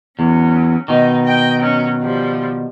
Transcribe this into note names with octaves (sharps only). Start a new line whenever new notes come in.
E2 F#3 C#4
B2 D#3 D#4
D#5 G5
F#3 C#4
F3 G3